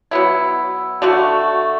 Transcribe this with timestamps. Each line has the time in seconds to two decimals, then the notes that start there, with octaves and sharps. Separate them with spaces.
0.11 F#3 B3 E4
1.02 D3 A3 F#4